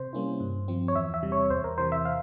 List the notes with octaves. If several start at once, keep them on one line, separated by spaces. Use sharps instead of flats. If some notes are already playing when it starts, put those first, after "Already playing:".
Already playing: C3 C5
G3 A#3 C#4 E4
G2
F3 C4
C#5
E2 E5
E5
C3 G3
C#5
E2 C5
A#4
C3 E3 C5
E5
F5